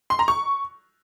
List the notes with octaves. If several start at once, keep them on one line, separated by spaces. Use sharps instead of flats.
C6
A#5
C#6